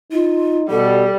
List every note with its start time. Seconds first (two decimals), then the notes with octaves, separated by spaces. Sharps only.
0.12 D#4 F4
0.70 B2 G3 A4